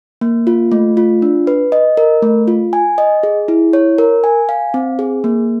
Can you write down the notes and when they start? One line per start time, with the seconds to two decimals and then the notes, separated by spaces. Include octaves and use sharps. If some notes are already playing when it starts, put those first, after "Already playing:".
0.21 A#3
0.47 F4
0.72 A3
0.97 F4
1.22 D4
1.47 B4
1.72 D#5
1.97 A#4
2.22 A3
2.48 F4
2.73 G#5
2.98 D#5
3.23 G#4
3.48 E4
3.73 C#5
3.98 A#4
4.24 G#5
4.49 F5
4.74 C4
4.99 G#4
5.24 A#3